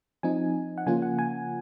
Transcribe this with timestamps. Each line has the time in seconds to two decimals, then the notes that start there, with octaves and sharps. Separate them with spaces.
0.23 F3 C4 D#4 G#5
0.78 F#5
0.86 C#3 F3 A#3 C#4 F4 G#5
1.02 F#5
1.19 G#5